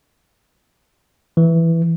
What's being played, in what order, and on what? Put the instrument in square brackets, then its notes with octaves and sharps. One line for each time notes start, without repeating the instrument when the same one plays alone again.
[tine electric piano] E3